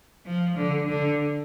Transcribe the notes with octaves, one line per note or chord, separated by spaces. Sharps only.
F3
D3
D3